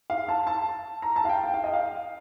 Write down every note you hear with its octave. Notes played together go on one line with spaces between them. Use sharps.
F5
A5
A5
A#5
A5
F5
G5
G5
F5
D#5
F5